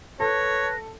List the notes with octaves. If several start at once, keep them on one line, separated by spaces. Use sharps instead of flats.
A4 B4 C#5 A#6